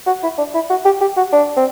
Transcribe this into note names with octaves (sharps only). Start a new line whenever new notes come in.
F#4
E4
D4
E4
F#4
G4
G4
F#4
D4
C4